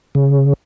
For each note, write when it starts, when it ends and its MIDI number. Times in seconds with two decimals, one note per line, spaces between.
0.15 0.53 49